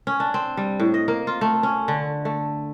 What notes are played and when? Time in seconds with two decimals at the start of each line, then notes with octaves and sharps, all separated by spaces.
0.07 C#4
0.20 D4
0.34 C4
0.57 G3
0.80 A2
0.94 D#5
1.08 A#3
1.27 F4
1.41 A3
1.63 C#4
1.88 D3
2.25 A3